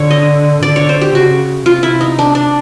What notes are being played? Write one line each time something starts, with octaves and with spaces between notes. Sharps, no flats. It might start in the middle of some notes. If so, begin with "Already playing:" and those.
Already playing: D3 C#5
D#5
D3 D5
C#5
C5
G4
C#3 F#4
C3 F4
E4
D#4
D4
D4